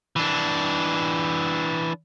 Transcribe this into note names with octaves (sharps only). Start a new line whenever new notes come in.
E3 D4